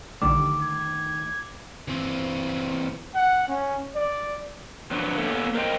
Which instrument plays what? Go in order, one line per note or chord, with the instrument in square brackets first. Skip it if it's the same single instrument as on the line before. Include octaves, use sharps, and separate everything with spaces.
[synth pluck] A#1 D3 G3 [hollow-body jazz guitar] D#3 A3 [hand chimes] D6
[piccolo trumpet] G#6
[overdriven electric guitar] E3 C4
[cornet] F#5
C#4
D5
[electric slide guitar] F3 F#3 D4 B4
A#3 B3 C#4 A4
A#4 C5 D#5 G5